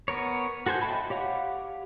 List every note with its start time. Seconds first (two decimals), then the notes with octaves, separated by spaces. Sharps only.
0.08 B3 A#4 C#5
0.66 F#4 A4 C5 G#5 G6
0.82 D#5 E5 G5 A5 B5
1.10 G4 C#5 F5 F#5